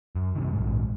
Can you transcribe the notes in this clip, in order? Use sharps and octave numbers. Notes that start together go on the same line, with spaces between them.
F#2
G2 C3 D#3
A#1 G#2